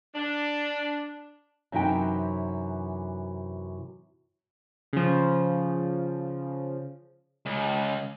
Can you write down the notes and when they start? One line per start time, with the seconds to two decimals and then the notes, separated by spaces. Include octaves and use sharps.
0.16 D4
1.72 F#2 C3 E3 F#3 D#4 G5
4.93 C#3 F3
7.46 C#2